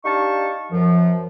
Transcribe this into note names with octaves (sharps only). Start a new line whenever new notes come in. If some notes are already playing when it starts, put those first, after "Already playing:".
D4 D#4 G4 F5 A5 C#6
F#2 F3